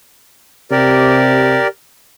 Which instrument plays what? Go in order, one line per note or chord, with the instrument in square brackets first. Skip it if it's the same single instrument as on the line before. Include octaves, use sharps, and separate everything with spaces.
[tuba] C3 [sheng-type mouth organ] G4 A#4 D5